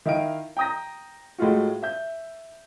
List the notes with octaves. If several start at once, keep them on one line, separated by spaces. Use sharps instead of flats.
D#3 E4 D#5 F5 D7
G5 A#5 D#6 G6 A#6
A2 G#3 F4 F#4
E5 G6